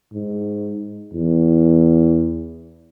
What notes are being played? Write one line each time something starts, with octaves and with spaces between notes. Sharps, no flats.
G#2
E2